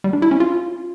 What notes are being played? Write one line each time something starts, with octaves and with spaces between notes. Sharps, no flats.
G3
D4
E4
C#4
F4